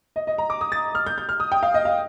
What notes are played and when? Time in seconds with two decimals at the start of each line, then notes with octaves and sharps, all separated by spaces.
0.16 D#5
0.27 D#5
0.38 A#5
0.50 D6
0.61 D#6
0.72 A6
0.95 F6
1.06 G6
1.18 G6
1.29 F6
1.40 D#6
1.52 G5
1.63 F5
1.74 D#5
1.85 F5